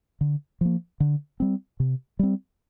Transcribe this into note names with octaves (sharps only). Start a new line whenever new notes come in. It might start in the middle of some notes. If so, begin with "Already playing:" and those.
D3
F3 A#3
D3
G3 C4
C3
G3 C4